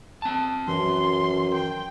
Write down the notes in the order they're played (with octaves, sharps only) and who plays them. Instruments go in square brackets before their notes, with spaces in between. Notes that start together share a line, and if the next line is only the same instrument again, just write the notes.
[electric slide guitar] C4 A5
[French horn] F#2 [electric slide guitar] E3 [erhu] C6
[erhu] G5